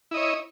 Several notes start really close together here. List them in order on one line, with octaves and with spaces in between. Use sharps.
E4 D#5 C#5